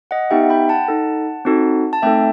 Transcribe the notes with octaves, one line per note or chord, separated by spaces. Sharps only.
D#5 F#5
B3 D#4 G4 E5 G5
G5 B5
F#5 A5
D#4 A4
C4 D#4 F#4 A4
A5
A3 C4 D#4 A4 E5 G5